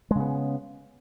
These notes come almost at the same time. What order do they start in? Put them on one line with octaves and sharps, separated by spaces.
G#3 C#3 B3